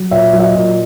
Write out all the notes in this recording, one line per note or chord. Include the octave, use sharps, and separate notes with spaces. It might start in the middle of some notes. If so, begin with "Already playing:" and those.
Already playing: F#3
A#2 C#5 E5
F#3
E5
D#5
A#2